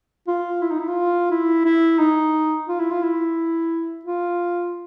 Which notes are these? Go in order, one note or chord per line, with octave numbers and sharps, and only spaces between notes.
F4
E4
D#4
E4
F4
E4
E4
D#4
F4
E4
F4
E4
F4